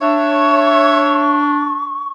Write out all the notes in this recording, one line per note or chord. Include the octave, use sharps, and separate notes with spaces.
D4 C#5 E5 C#6